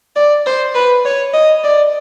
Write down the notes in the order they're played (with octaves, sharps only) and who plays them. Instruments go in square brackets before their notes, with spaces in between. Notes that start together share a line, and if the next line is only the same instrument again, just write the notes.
[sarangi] D5
C5
B4
C#5
D#5
D5